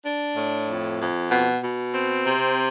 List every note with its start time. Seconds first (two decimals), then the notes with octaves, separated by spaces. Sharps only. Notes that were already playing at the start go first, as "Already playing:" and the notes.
0.06 D4
0.37 A2
0.68 F2
1.00 F2
1.31 B2
1.63 B2
1.94 C4
2.26 C3